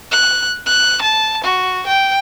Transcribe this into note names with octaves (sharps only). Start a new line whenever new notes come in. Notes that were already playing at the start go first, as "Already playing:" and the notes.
F#6
F#6
A5
F#4
G5